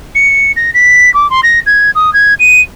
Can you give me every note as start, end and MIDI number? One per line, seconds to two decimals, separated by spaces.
0.15 0.51 97
0.56 0.70 94
0.74 1.12 95
1.14 1.29 86
1.30 1.40 84
1.43 1.59 94
1.66 1.90 92
1.95 2.12 87
2.13 2.34 92
2.39 2.60 99